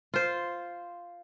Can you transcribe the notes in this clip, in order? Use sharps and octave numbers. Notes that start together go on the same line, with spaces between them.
F4 C5